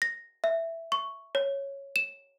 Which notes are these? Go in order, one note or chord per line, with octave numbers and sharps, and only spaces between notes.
A#6
E5
C#6
C#5
E7